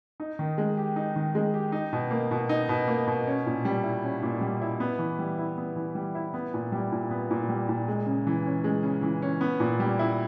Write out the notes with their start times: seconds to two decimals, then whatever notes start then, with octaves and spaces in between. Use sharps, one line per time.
0.20 D#4
0.39 D#3
0.58 G#3
0.77 G4
0.96 D#4
1.16 D#3
1.35 G#3
1.54 G4
1.72 D#4
1.93 B2
2.11 A#3
2.31 B2
2.49 D#4
2.69 B2
2.88 A#3
3.07 B2
3.27 C#4
3.46 A#2
3.65 G3
3.84 E4
4.04 C#4
4.22 A#2
4.41 G3
4.61 E4
4.80 B3
4.99 E3
5.19 G3
5.38 E4
5.58 B3
5.76 E3
5.95 G3
6.15 E4
6.34 B3
6.54 A#2
6.72 G3
6.92 A#2
7.11 B3
7.31 A#2
7.49 G3
7.69 A#2
7.88 G#3
8.06 C#3
8.27 E3
8.46 C#4
8.64 G#3
8.83 C#3
9.02 E3
9.22 C#4
9.41 B3
9.60 A#2
9.80 G3
9.99 E4